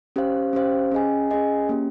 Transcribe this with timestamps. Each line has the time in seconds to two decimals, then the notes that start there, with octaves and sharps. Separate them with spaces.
0.16 C#4 G4 C5 F5
0.53 C#4 G4 C5 F5
0.91 C#4 G#4 D#5 G#5
1.31 C#4 G#4 D#5 G#5
1.69 A#3 C#4 G4